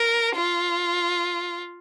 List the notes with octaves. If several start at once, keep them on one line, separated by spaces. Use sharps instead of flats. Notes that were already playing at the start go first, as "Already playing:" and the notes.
Already playing: A#4
F4